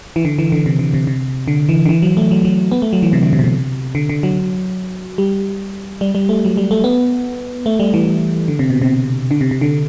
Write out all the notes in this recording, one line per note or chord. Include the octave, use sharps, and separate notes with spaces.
E3
D3
E3
D3
C3
D3
C3
C3
D3
E3
D3
E3
F#3
A3
F#3
F#3
B3
A3
F#3
E3
C3
D3
C3
B2
C3
D3
D3
F#3
G3
G3
G3
A3
F#3
G3
A3
B3
A3
G3
E3
D3
C3
B2
C3
D3
C3
C3
D3